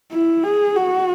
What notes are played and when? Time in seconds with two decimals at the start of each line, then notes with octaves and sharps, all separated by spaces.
0.12 E4
0.44 G#4
0.76 F#4